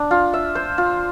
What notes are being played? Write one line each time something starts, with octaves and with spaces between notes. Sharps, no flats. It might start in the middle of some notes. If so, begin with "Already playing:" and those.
Already playing: D4
F4
E5
C5
F4